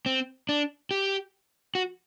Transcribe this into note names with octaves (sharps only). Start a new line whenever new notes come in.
C4
D4
G4
F#4